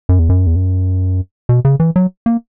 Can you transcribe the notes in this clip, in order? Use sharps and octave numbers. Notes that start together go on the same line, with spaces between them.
F#2
E2
F#2
E2
F#2
B2
C#3
E3
F#3
A#3